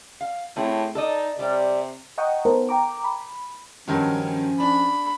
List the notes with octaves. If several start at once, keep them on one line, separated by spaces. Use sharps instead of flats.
F5
A2 A3 C4 G#4
D#4 A4 D5 D#5
C3 G3 D5
D#5 F#5 G5 A#5 C#6 D#6
B3 D#4 A4 A#4 C5
G5 A#5 D6
B5
G2 D#3 F3 F#3 C#4
D4 B5